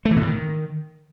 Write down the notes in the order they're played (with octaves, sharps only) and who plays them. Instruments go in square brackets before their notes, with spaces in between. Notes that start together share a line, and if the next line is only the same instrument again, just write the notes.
[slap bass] A3
E3
B2
A2
D#3